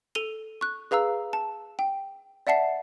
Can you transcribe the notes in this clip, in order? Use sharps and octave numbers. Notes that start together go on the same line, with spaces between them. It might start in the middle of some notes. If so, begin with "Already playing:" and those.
A4 D#7 F7 G7
C#6 F#6
G#4 B4 F5 A#5 E6
A5
G5
D5 E5 F#5 A5 C7